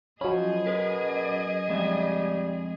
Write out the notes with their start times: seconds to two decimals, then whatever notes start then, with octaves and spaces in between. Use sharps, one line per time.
0.21 F3 F#3 C#4 G#4 D#5 B5
0.66 B2 A#4 B4
1.68 F2 G3 G#3 E5